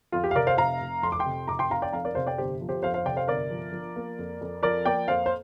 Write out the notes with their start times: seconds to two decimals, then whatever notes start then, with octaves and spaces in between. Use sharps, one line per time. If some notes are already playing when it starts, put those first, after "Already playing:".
0.12 F2 F4
0.24 G4
0.31 F5
0.35 C3 A#4 D5
0.47 C5 F5
0.57 F1 F5 A#5
0.80 F1
1.03 F2 C6
1.12 D6
1.19 G5 C6
1.26 C3
1.47 F1 A#5 D6
1.59 G5 C6
1.70 F1 F5 A#5
1.82 D5 G5
1.93 F2 F5 A#5
2.05 A#4 D5
2.15 C3 C5 F5
2.27 D5 G5
2.38 G1 G4 C5
2.61 F3
2.69 G4 C5
2.83 F2 C5 F5
2.94 C5 F5
3.05 C3 D5 G5
3.17 C5 F5
3.28 G1 A#4 D5
3.50 F3
3.73 F3
3.96 A#3
4.19 F2
4.41 F2
4.63 F3 A#4 D5
4.85 A#3 D5 G5
5.08 F2 C5 F5
5.26 C5